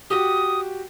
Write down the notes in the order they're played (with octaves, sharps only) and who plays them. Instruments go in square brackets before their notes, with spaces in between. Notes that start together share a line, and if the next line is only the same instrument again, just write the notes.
[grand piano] F#4 G4 [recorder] D#6